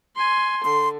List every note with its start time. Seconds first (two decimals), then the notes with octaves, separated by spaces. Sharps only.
0.15 G#5 C6
0.65 D3 C6